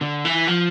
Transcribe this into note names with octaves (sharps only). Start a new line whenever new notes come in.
D3
E3
F3